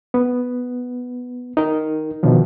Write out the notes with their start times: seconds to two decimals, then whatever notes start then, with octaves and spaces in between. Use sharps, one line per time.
0.14 B3
1.57 D#4 A#4
2.23 B2 D3 D#3 F3